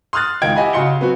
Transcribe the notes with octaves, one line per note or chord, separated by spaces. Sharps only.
C6 D#6 F6 F#6 A6
C#2 D#3 D#4 G5 G#6 D7
E4 G4 D#5 F#5 G#5 B5
C#3 F#4 D#5 C6 C#7 G7
F#3 B3 C4 F#4